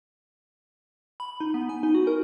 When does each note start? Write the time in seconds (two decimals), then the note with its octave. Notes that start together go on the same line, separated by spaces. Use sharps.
1.20 B5
1.40 D#4
1.54 B3
1.69 G#5
1.83 D#4
1.95 F#4
2.07 A#4